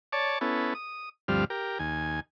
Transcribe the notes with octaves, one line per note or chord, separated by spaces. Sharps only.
C#5 D5 A5
B3 C#4 E4 A4
D#6
D2 G2 F3 G3 C4 F6
G4 A#4
D#2 G#5